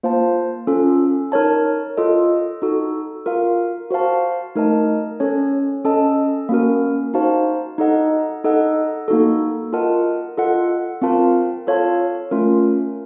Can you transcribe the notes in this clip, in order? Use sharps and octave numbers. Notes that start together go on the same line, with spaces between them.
A#3 F4 C5 F5 A5
C#4 F4 A4
D#4 A#4 C#5 A5
F4 A4 D#5
D#4 F#4 A4
F4 A#4 F5
F#4 C5 F5 A5
A3 D#4 A#4 D#5 A5
C#4 A4 C#5 A5
C#4 A4 D#5 A5
A#3 C#4 F#4 A#4
D#4 F#4 C5 F5 A5
D#4 A4 D#5 F#5
D#4 A4 D#5 F#5
A#3 D#4 F#4 A4
F4 A#4 D#5 F#5 A5
F4 A4 D#5 F#5
C4 F4 A#4 F5 A5
F4 A4 C#5 F5 A5
A3 C#4 F4 A#4